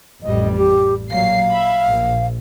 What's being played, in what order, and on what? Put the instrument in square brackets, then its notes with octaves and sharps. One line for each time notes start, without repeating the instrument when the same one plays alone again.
[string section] A1 F2 G3 [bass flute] D#5
[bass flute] G4
[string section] A#2 F#3 C7 [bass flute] F5
[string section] E5 B5
A#1